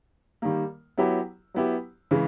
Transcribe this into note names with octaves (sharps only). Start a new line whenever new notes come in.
D#3 G3 A#3
F#3 B3 E4 G4
F#3 B3 E4 G4
C#3 E3 G#3